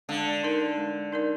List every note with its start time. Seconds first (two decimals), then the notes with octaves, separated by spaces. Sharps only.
0.09 D3 G#3
0.43 D#4 A#4 D5
0.78 G#3
1.12 D#4 A#4 D5